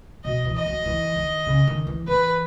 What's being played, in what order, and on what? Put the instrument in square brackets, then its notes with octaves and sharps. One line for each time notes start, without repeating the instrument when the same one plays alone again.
[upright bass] B2 [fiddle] D#5
[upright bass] E3
[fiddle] D#5
[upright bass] F#3
E3
D#3
C#3
D#3
E3
[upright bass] E3 [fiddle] B4